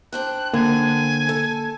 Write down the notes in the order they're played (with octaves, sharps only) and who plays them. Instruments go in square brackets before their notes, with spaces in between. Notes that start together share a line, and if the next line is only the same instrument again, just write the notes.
[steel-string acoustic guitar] D4 C5 G5 [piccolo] F#6
[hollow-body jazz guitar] D3 [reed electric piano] A#3 [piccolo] G#5
[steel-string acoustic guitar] A4